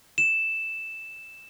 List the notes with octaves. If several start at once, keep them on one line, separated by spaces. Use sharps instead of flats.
E7